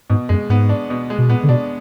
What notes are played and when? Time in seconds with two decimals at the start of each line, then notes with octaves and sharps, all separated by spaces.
0.10 G#2 B2
0.29 F#2 G#3
0.49 G#2 B3
0.69 D4
0.90 B2
1.10 G#3
1.18 B2
1.29 A#2 B3
1.43 D3
1.49 B2 D4